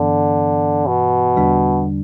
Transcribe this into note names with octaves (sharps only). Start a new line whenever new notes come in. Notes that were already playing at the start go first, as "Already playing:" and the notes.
Already playing: G2 D3 E3 B3
B2
E2 D3 G3 D4